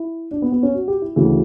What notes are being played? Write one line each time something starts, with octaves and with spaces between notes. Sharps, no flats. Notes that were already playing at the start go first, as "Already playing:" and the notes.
Already playing: E4
D4
B3
B3
C#4
F#4
G4
E4
D2 C#3 E3 F#4